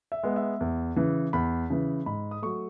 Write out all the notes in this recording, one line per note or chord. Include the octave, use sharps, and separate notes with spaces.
E5
G#3 B3
E5
E2
C#3 E3
E2 B5
C#3 E3
G#2 B5
D#6
F#3 A3 C#6